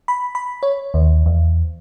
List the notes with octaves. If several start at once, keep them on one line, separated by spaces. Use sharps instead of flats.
B5
B5
C#5
D#2
E2